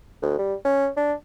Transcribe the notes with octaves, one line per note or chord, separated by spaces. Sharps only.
D2
G3
C#4
D4